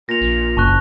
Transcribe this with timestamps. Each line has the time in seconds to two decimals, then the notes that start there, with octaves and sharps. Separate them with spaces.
0.09 A#2 A#6 F7
0.21 A#1
0.57 F#1 A5 C#6 F#6